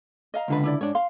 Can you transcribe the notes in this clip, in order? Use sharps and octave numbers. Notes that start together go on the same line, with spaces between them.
D#5 F5 A#5
C#2 D3 B4
D4 E4 D5
G#2 D4 C#5
F5 C6